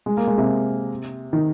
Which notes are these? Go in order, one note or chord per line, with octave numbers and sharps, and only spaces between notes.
G#3
A#3
G#3
C3
D#3